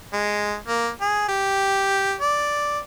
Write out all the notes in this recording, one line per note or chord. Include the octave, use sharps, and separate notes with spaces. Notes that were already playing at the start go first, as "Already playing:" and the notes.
G#3
A#3
G#4
G4
D5